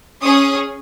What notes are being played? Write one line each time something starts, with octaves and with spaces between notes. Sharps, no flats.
C#4 G#4 D#6